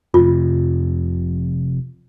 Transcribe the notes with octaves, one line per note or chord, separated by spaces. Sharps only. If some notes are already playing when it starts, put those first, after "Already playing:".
F1 F2 C3 F4